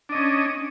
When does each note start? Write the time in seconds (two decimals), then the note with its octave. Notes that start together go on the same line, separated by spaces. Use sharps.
0.09 D4
0.12 D#5
0.15 C#4